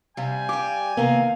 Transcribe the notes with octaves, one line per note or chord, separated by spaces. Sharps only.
C3 G3 F5 G#5
G3 G4 D6
C3 D#3 A#3 B3 F5